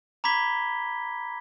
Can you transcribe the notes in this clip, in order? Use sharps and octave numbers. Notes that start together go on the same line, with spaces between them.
A#5 B5 D6 G#6 B6 G7